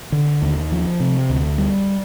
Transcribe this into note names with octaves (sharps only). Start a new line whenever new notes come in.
D3
D#2
F3
C3
D2
G3